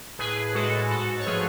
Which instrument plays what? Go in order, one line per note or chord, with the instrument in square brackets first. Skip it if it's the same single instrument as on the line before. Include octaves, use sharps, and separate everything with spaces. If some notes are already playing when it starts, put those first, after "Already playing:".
[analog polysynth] A2 G#4 B4
G#3 F#4 A4
G#2 F#4 A4
C#5
F3 A3 G#4 B4